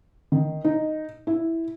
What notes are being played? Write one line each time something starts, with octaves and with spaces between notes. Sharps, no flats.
D#3
D#4
E4